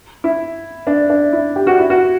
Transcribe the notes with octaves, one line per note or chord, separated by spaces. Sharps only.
E4
D4
D4
E4
G4
F#4
E4
F#4